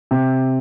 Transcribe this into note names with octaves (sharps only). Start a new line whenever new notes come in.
C3